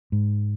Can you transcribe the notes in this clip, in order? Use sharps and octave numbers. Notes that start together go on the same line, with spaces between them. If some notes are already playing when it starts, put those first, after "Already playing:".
G#2